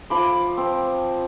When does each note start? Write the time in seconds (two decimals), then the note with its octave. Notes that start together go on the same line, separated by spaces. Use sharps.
0.10 F3 B5 D6
0.57 C4